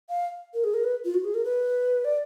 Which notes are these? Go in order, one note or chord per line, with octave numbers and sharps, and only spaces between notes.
F5
A#4
G#4
A#4
B4
F4
F#4
G#4
A#4
B4
D5